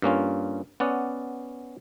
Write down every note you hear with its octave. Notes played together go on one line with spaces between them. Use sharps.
G2 A#3 C#4 F4
B3 C#4 D5 F#5